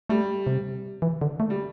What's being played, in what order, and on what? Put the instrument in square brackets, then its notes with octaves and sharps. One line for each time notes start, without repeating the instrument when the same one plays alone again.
[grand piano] G3 [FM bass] A3
[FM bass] C3
E3
D3
A3
[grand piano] G3